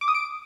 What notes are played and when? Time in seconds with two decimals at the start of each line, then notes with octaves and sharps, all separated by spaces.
0.01 D6
0.08 D#6
0.14 D7